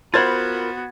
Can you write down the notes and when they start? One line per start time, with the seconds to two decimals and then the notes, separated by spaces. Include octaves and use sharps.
0.14 B3 F4 F#4 A#4 C5 B5 G#6 A6